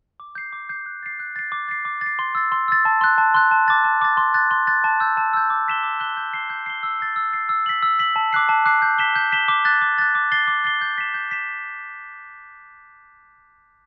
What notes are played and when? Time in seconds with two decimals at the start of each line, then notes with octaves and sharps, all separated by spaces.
0.20 D6
0.35 G6 C7
0.53 D6
0.69 G6 C7
0.86 F#6
1.03 A6 C7
1.20 F#6
1.36 A6 C7
1.52 D6
1.69 A6 C7
1.85 D6
2.01 A6 C7
2.19 C6
2.35 E6 A6
2.52 C6
2.68 E6 A6
2.85 A5
3.01 C6 F#6
3.18 A5
3.34 C6 F#6
3.51 A5
3.68 D6 A6
3.84 A5
4.01 D6 A6
4.17 C6
4.34 F#6 A6
4.51 C6
4.67 F#6 A6
4.84 A5
5.00 E6 G6
5.17 A5
5.33 E6 G6
5.50 D6
5.68 F#6 B6 E7 G7
5.83 D6
6.00 F#6 B6 E7 G7
6.17 G6
6.33 C7 G7
6.50 G6
6.66 C7 G7
6.83 E6
7.00 A6 C7
7.16 E6
7.33 A6 C7
7.49 E6
7.66 B6 F#7
7.83 E6
7.99 B6 F#7
8.16 A5
8.33 D6 F#6 C7
8.49 A5
8.65 D6 F#6 C7
8.82 G6
8.98 B6 E7 G7
9.16 G6
9.32 B6 E7 G7
9.48 D6
9.65 F#6 A6
9.81 D6
9.98 F#6 A6
10.15 D6
10.32 A6 C7 G7
10.47 D6
10.64 A6 C7 G7
10.81 G6
10.98 B6 E7
11.14 G6
11.31 B6 E7